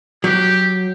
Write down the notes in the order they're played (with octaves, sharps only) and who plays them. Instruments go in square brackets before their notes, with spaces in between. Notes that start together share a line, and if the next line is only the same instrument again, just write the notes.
[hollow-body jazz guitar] F#3 [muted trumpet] G4